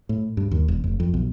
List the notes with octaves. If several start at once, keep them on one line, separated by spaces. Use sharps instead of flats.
A2
G2
D#2
E1
F1
F2
B1